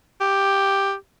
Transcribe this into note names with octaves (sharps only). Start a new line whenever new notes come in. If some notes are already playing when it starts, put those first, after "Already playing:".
G4